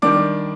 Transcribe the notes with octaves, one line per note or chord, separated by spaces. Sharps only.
D#3 G3 D4 D6